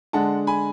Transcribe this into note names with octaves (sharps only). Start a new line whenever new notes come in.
D3 G#3 D4 F#5 A5
G#5 B5